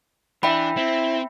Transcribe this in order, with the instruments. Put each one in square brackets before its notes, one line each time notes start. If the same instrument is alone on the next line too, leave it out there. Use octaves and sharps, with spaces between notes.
[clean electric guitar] E3 [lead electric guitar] D4 [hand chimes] E5 G5 B5
[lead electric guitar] C4 [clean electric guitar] E4